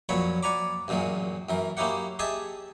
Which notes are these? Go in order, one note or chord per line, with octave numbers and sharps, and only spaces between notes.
F2 A#2 F#3 C#5 B5
D5 F#5 G#5 A#5 B5 D6
A1 F#2 A#2 F#3 G#3
F#2 E3 A#4
A#3 C#4 D#4 E4 G4 F#5
G4 G#4 D#5 E5 G#5 A5